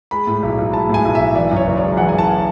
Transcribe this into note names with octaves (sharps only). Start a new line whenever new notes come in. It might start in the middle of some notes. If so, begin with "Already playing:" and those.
G#3 B5
A2
B1
B1
G#3 A5
A2 G#5
B1
B1 E5
E3 D5
F#2
C#5
F#1
D5
G#3
E3 F#5
F#2 G#5
A5